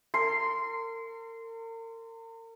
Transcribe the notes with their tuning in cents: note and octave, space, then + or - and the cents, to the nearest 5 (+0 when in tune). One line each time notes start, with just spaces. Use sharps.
A#4 -40 C6 -15